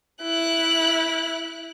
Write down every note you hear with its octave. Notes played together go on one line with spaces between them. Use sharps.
E4 F#6